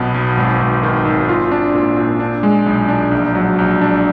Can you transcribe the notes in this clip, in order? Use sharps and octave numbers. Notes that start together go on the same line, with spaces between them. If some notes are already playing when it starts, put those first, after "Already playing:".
Already playing: B1 B2 B3
B1
G#1
G#1
D#3
G#1
F4
D4
A#2
A#2
D4
G#3
B1
D4
A#1
F#3
A#1
D4